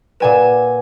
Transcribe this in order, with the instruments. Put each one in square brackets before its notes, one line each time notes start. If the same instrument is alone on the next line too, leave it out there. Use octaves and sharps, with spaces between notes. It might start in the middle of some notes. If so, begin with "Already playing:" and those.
[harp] A#2 G#5 E7 [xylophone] B4 D5 F#5